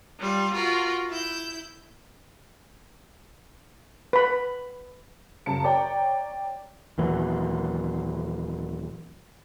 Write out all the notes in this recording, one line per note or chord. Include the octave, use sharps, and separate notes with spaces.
G3 F4
F4 F#4 A#4
E4 G6
B4 B5
F#2 C#3 A5 A#5 C#7
C#5 D5 G5 A#5
D#2 A#2 E3 F#3